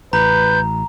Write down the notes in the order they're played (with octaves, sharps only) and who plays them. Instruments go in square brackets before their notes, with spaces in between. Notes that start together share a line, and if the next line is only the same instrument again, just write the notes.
[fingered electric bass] A1 [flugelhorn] B4 [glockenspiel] A#5 [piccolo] G6